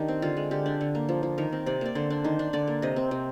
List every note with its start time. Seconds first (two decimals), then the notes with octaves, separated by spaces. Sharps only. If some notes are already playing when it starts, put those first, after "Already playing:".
Already playing: D#3 D4 G4
0.08 C4
0.22 D3 F4
0.37 G#3
0.51 D3 G4
0.66 D4
0.81 D3
0.95 A#3
1.09 F3
1.23 F3
1.38 D#3 A#4
1.52 C4
1.66 C3 D5
1.81 A#3 D5
1.95 D3 C5
2.10 D4
2.24 D#3 C5
2.39 D4
2.53 D3 D5
2.67 A#3
2.82 C3 D#5
2.96 C4
3.11 C3